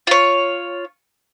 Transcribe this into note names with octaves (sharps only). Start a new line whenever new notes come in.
F4 C#5